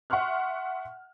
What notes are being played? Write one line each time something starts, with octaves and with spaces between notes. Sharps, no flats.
E5 F#5 C6 C#6 F6 F#6